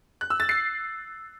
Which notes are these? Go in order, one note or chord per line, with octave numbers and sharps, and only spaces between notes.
F#6
E6
A6
C7